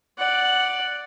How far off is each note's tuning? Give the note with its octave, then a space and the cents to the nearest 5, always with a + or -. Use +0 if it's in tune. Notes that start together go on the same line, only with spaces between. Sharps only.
D5 +0 F#5 +0